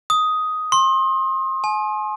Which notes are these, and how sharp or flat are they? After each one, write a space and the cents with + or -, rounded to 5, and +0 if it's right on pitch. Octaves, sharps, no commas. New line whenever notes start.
D#6 +5
C6 +30
G#5 +40